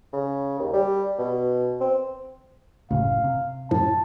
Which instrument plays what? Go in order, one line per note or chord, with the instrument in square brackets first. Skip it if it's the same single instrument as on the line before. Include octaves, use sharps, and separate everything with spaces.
[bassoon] C#3
D#2
G3
B2
C4
[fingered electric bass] F#1 A2 C#3 [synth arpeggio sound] D2 [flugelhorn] F5
[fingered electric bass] C3
[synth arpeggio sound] F#2 A2 F3 [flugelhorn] A5